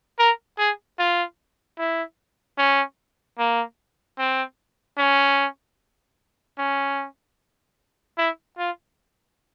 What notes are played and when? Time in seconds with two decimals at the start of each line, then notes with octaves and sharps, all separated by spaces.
0.19 A#4
0.58 G#4
0.99 F4
1.79 E4
2.58 C#4
3.38 A#3
4.18 C4
4.98 C#4
6.58 C#4
8.18 E4
8.58 F4